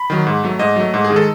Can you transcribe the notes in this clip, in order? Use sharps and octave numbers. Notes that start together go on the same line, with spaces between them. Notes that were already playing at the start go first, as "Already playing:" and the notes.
Already playing: B5
D#3 F#3
G#2
F#3 A3
G#2 D#5
F#3 A3
G#2
G#4
D#3 G#3
A4